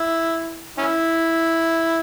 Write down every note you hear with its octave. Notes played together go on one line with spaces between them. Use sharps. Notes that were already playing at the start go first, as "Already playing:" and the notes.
Already playing: E4
C#4 E4